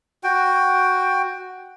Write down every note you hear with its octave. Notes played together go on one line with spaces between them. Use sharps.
F#4 G5